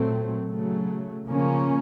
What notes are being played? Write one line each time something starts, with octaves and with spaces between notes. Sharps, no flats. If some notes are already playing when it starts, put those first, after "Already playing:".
Already playing: A#2 F#3 A3 C4
C#3 F#3 A3
C#3 F3 A#3 C#4